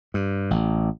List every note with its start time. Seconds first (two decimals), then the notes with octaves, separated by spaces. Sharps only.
0.14 G2
0.51 A1